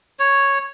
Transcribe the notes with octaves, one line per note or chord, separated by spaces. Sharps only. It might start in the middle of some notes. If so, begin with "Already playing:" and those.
C#5